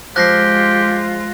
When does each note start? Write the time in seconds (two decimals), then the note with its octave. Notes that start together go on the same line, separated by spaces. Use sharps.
0.16 F3 G#3 F4 G4 F#6 A#6 C7